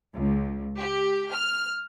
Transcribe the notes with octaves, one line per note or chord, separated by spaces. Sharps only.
C#2
G4
F6